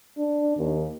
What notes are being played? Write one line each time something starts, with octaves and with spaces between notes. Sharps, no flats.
D4
D#2